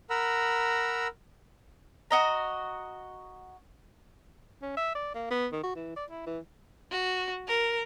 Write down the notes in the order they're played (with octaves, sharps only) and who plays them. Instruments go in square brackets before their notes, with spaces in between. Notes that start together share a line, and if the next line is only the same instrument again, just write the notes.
[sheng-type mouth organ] A#4 F#5 A#5 B5 E6
[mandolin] F#4 D#5 A#5
[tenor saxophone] C#4
E5
D5
A#3
B3
D#3
F#4
E3
D5
E4
E3
[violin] F#4
A#4